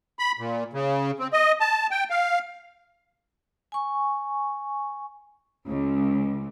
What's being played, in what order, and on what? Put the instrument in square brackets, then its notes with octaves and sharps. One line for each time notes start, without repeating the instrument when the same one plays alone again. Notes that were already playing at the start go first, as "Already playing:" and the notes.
[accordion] B5
A#2
C#3
C4
D#5
A5
G5
F5
[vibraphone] G#5 C#6
[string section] C#2